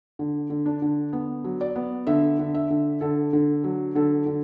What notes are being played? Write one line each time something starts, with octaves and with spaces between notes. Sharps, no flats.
D3
D3
D4
D3
B3
F#3
D5
B3
D3 E5
D3
E5
D3
D3 A4
D3
F#3
D3 A4
D3